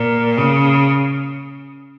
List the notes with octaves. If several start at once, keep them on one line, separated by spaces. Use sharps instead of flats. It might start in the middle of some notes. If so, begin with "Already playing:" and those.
Already playing: A#2
C#3